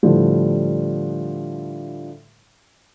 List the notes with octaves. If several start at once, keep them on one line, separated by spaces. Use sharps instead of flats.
A2 D3 F3 G3